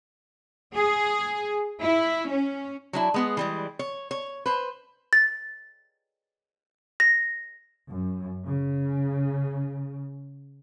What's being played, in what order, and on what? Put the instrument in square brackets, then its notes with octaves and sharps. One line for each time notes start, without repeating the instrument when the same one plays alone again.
[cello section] G#4
E4
C#4
[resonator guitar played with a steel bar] F#3 D4 E4
G#3 B3 G#4
E3 G3 G#3
C#5
C#5
B4 C5
[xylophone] A6
A#6
[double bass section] F#2
C#3